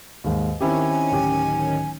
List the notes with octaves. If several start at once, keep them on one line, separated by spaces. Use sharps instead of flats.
D#2 G#2
D#3 C4 C#4 E4 G4 G#5
D1 G4